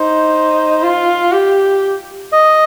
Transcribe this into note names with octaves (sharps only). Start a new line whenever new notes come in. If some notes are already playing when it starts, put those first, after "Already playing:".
Already playing: D#4 C5
F4
G4
D#5